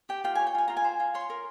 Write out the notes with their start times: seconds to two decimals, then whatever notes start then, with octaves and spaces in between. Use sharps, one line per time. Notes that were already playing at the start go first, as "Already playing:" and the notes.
0.09 G4 G5
0.24 F4 G5
0.35 G#5
0.39 C#5
0.47 G5
0.55 F4 G#5
0.68 F4 A#5
0.77 G#5
0.84 C5
1.00 F4
1.14 C#5 C6
1.30 A#4